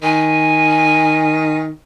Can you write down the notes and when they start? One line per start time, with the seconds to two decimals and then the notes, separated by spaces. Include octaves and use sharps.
0.02 D#3 G#5